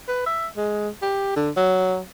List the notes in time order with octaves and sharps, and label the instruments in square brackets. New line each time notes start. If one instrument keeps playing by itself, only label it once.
[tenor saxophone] B4
E5
G#3
G4
D3
F#3